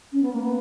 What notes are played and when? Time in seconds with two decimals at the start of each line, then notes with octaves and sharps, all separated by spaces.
0.12 C#4
0.22 B3
0.33 A#3
0.42 B3